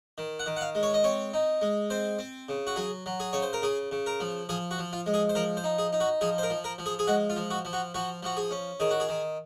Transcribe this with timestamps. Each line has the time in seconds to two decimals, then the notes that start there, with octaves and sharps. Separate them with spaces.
0.18 D#3
0.39 F#5
0.46 D#3
0.56 F#5
0.61 F5
0.75 G#3
0.83 C#5
0.94 D#5
1.04 C4 C#5
1.34 D#4
1.61 G#3
1.90 C4 C5
2.19 C4
2.49 C#3
2.67 F#4
2.76 F#3 G#4
3.06 F#3
3.20 G#4
3.33 C#3 C#5
3.42 C5
3.53 A#4
3.62 C#3 G#4
3.91 C#3
4.06 A#4
4.20 F3
4.49 F3 G#4
4.71 F#4
4.78 F3
4.93 F4
5.06 G#3
5.14 G#4
5.29 C5
5.35 F3 A#4
5.57 C5
5.64 D#4
5.78 G#4
5.93 D#4
6.00 F#4
6.21 F3 G#4
6.38 C5
6.43 A#4
6.50 F3
6.64 A#4
6.78 F3
6.86 G#4
6.99 G#4
7.07 G#3 F#4
7.30 F4
7.36 F3
7.51 F#4
7.65 F3
7.73 F#4
7.94 F3 F#4
8.23 F3 F#4
8.37 G#4
8.51 C#4
8.80 D#3 G#4
8.91 F#4
9.00 G#4
9.09 D#3